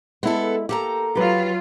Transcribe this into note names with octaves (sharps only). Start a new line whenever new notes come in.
G#3 B3 E4 A4
A#3 G4 A4 A#5
F#3 F4 G4 B4